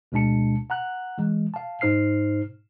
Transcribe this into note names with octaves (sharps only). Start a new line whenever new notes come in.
D2 B2 G#3 D4 A5 C#7
F#5 A#5 F#6
E3 G#3
F5 A5
G#2 D#4 C5 F6 C7